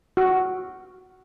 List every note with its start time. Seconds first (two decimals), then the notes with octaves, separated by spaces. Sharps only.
0.17 F#4